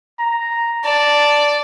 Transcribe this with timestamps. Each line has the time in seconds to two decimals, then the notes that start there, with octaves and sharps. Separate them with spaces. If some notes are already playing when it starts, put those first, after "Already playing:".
0.19 A#5
0.84 D5 A5